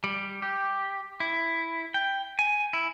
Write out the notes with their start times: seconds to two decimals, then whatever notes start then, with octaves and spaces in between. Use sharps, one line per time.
0.04 G3
0.42 G4
1.20 E4
1.94 G5
2.39 G#5
2.73 E4